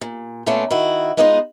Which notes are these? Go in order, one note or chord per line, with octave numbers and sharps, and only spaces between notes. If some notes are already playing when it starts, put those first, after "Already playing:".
A#2
A#2 A3 B3 C#4 D4 F4
D#3 E4 F#4
G#3 B3 D#4 F4 D5 D#5